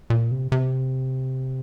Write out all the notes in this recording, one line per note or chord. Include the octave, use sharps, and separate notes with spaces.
A#2
C3
C3